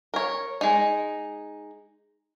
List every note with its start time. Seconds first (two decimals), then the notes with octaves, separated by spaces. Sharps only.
0.14 A#4 C#5
0.61 G#3 D#4